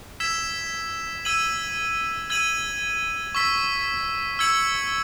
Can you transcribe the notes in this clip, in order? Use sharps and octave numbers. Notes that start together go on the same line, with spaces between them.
E6 G#6 B6 E7
E6 G#6 D#7 F#7
E6 G#6 D#7 F#7
C#6 E6 B6
E6 G#6 C#7 F#7